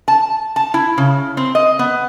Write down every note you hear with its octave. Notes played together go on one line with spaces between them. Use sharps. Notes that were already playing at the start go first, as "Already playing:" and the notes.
A5
A5
E4
C#3
C4
D#5
B3